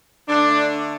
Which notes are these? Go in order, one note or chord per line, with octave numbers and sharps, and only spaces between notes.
D3 A3 D4